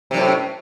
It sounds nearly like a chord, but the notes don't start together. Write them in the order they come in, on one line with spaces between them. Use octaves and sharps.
C3 F#2 A2